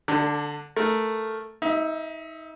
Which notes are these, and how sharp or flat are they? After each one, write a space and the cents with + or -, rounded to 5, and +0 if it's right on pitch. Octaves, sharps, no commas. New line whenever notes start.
D3 +0 D4 +0 A4 +40
A3 +0 A#4 +0
D#4 +30 E5 +0